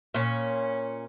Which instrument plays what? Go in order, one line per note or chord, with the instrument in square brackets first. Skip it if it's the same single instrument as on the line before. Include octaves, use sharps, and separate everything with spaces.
[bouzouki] A#2 C#4